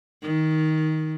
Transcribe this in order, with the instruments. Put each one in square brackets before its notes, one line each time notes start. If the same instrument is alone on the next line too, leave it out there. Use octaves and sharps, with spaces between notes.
[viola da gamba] D#3